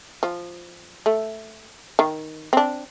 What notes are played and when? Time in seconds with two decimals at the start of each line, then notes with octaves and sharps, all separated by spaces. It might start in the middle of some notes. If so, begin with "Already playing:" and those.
0.23 F3
1.06 A3
1.99 D#3
2.53 C4 D4